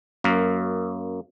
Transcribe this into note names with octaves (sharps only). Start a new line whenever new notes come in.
F#2 A#3